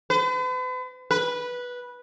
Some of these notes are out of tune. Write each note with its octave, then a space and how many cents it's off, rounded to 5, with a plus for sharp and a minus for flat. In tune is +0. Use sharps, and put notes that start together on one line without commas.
B4 +45
B4 -10